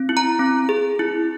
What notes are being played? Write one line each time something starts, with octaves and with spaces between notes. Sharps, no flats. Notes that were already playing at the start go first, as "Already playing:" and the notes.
Already playing: C4
E4
A#5
C4
G#4
E4